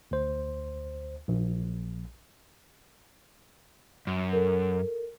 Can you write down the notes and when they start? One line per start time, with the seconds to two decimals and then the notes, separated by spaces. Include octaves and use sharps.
0.11 D2 C5
1.28 A#1
4.07 F#2
4.33 A4 A#4